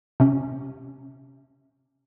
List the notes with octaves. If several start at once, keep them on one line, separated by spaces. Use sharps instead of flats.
C3 C#4